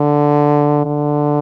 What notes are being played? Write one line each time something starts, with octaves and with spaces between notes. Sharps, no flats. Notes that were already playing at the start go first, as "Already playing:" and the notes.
Already playing: D3
D3